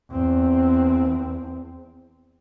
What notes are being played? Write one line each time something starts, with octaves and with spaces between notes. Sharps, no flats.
E2 C4